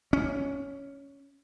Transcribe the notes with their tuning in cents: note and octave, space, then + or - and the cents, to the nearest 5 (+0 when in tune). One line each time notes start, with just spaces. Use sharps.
C#4 +5